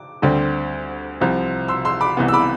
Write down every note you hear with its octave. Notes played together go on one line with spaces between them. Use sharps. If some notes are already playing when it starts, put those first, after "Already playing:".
Already playing: D6
D2 D3 G3 C4
C2 C3 F3 C4
C6 E6
C6 E6
B5 D6
C2 C3 E3 B3
E6
B5 D6